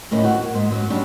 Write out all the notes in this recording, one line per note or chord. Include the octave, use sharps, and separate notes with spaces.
D2 A2 D#3 C#4
F#4
A#3
G#2
F#2 F#3
F#3 G3 C#4 D4